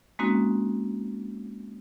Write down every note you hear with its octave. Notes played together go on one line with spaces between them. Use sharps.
G#3 A#3 C4 C#4 D#4 F#4